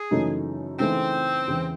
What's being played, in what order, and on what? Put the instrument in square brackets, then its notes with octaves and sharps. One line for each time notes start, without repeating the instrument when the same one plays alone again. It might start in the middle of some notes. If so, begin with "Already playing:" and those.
Already playing: [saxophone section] G#4
[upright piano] F#2 C#3 E3 A3 D#4
[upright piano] C#3 E3 A3 D#4 [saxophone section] C4
[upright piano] E2 C#3 E3